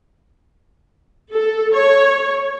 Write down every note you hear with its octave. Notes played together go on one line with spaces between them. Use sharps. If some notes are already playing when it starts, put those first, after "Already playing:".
A4
C#5